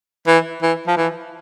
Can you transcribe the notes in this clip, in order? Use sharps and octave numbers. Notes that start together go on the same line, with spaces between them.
E3
E3
F3
E3